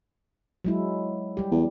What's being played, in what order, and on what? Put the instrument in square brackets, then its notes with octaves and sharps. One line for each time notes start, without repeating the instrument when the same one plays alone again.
[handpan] F#3 G#3 E4
G3 G4
[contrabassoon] E2